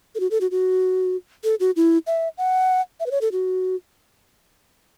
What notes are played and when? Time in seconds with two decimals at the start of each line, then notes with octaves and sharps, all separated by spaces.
0.15 A4
0.20 F#4
0.31 A4
0.41 F#4
0.51 F#4
1.44 A4
1.60 F#4
1.76 E4
2.07 E5
2.38 F#5
3.00 E5
3.06 B4
3.11 C#5
3.21 A4
3.32 F#4